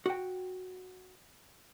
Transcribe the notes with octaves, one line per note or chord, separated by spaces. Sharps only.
F#4 G5